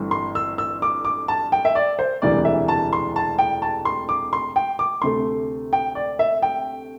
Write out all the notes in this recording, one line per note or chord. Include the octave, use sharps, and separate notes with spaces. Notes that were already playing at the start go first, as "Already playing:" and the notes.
Already playing: G1 G2 E3 A3 C4
C6
E6
E6
D6
D6
A5
G5
E5
D5
C5
E1 D2 C3 E3 G3 D5
E5
A5
C6
A5
G5
A5
C6
D6
C6
G5
D6
D2 C3 A3 C6
G5
D5
E5
G5